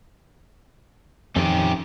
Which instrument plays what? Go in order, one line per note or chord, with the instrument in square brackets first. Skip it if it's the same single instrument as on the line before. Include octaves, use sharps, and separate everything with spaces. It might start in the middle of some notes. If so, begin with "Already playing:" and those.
[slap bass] F2 D#3 [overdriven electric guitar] C#4 G4